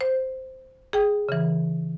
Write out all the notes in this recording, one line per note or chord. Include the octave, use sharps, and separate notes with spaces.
C5
G#4 G5
C#3 E3